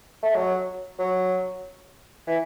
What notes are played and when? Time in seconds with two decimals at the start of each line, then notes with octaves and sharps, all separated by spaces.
0.23 A3
0.35 F#3
0.99 F#3
2.27 E3